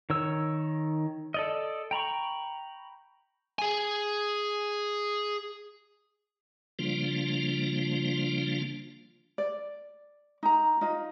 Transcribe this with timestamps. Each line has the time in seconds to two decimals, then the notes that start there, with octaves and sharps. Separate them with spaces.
0.10 D#3 C#5 E6
1.34 A4 D5 D#5
1.91 G5 A#5 B5 C#6
3.59 G#4 G#5
6.79 C#3 F3 G3 A#3 D4 F4
9.38 D5
10.43 D#4 A#5
10.81 D#4 F4 D#5